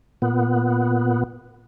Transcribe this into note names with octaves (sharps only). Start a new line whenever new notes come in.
A#2 B3